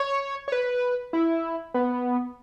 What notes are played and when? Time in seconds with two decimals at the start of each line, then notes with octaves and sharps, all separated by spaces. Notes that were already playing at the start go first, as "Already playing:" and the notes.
Already playing: C#5
0.48 C#5
0.52 B4
1.13 E4
1.74 B3